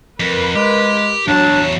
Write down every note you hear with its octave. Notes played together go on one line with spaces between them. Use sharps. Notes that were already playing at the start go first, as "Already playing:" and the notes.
F2 A#4 B4
G#3 G4
E2 F#3 D4 A5